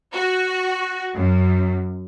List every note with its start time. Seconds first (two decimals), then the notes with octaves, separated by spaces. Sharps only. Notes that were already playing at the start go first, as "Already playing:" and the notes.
0.12 F#4
1.14 F#2